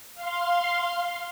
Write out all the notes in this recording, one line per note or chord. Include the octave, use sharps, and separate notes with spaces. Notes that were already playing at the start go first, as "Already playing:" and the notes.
F5 C6